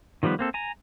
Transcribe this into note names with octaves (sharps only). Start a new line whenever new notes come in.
D#3 F3 G3 B3 B4
A#3 C4 A4
G#5 A#5